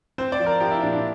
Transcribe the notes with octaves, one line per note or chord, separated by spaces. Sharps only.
C4 C5
D5
F3
A#4
F3 G4
E4
A#2 D4
D4